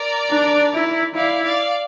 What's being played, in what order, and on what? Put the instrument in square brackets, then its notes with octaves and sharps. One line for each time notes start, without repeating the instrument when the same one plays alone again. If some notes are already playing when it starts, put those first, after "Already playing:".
Already playing: [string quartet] A#4 D5
[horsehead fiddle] D4
E4
[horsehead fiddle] E4 [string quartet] D5 F5
[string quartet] D5 F5